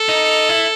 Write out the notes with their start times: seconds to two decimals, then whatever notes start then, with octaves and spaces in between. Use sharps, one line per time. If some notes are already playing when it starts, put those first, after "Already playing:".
Already playing: A4
0.09 D#4
0.49 E4